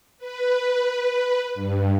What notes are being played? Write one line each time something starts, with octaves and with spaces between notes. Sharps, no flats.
B4
B4
G2